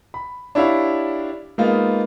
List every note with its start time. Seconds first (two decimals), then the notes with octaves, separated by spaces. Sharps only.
0.14 B5
0.55 D4 E4 G4 C#5 F5 B5
1.58 G#3 A#3 B3 D#4 F4